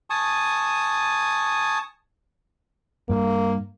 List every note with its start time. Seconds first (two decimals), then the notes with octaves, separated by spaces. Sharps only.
0.10 G#5 A5 C#6 D#6
3.09 G2 A#3